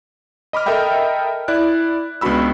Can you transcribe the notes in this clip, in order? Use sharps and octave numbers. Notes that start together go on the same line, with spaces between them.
D#5 B5 D6 F6
A4 A#4 D#5 E5 G5 B5
E4 D5 F#6
C#2 B3 D4 F#4 B5 E6